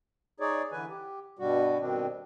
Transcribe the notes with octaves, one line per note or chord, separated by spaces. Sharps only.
D#4 G#4 C#5 D5
D3 E3 B4 G#5
G4
G2 B2 G3 F#4
G2 B2 D#3 C4 D4